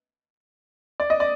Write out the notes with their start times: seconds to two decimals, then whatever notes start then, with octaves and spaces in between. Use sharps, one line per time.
1.00 D5
1.10 D#5
1.20 D5